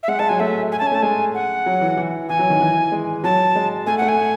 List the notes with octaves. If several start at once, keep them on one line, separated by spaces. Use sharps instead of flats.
E5
G#3 F#5
G#3 A5
F#3 G#5
A3 E5
G#5
C#4 A5
G#5
A3 A5
G#3 G#5
F#5
F#3
E3
E3
E3 G#5
F#3
D#3
E3
G#3
F#3 A5
G#3
A3 G#5
A3 F#5
G#5